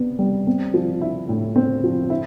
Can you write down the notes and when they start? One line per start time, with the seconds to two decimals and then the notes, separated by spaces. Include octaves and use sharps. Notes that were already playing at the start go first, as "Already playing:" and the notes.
Already playing: C3 B3 D4
0.19 G3
0.47 C4
0.74 F3
1.01 E4
1.29 A2
1.56 C4
1.84 F3
2.10 E4